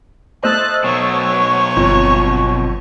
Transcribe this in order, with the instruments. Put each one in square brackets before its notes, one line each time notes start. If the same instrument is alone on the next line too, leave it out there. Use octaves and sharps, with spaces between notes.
[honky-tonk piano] A3 C5 [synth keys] D#5 E6 A6 [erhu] F#6
[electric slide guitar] B2 F#3 [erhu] C#5
[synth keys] G1 [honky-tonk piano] F2